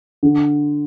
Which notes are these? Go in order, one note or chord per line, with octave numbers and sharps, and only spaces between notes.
D3